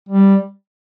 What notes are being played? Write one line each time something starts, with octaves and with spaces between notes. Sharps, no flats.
G3